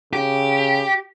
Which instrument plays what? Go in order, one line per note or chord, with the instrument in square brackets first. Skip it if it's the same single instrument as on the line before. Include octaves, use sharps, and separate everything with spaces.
[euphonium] C#3 [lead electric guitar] G4